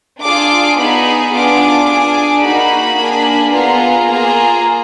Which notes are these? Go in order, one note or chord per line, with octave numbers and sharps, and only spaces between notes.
D4 F4 G#4 D6
B3 D#4 G#4 B5
B3 D4 F4 G#4 D6
D4 G#4
A#3 D#4 F#4 B5
A#3 D4 G#4
B3 F4 G#4 A#5
A#3 F4 G#4